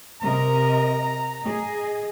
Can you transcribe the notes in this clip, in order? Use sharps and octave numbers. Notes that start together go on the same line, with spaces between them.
C3 A#4 D#5 A#5
G#4 D#5